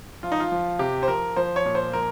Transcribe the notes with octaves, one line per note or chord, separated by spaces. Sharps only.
F3 F4
D#4
F4
F3
C3 G4
C5
F3 A#4
F3 C5
C#5
A#2
C5
F3 A#4